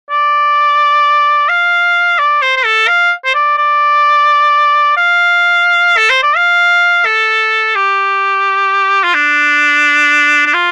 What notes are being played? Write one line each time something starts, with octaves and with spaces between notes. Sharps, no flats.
D5
F5
D5
C5
C5
A4
F5
C5
D5
D5
F5
A4
C5
D5
F5
A4
G4
F4
D4
D4
F4